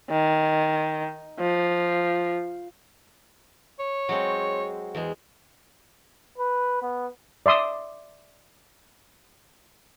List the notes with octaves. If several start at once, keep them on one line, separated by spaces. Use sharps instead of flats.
D#3
F3
C#5
F#3 G#3 C4
E2 G#3
B4
B3
D5 E5 C6 D#6 E6